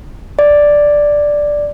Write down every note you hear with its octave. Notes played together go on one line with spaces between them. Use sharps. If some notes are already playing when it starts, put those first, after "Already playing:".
D5